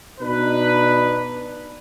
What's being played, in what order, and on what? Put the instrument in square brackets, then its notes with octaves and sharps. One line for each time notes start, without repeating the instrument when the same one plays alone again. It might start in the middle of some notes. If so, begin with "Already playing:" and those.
[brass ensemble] B2 D4 D#4 B4